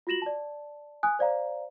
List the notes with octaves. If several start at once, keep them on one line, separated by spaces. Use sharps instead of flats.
F4 F#4 A#6 E7 F#7
D5 A5
G#5 D#6 F#6
C5 D5 F5 A#5